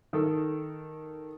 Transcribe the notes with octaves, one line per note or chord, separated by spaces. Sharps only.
D#3 A4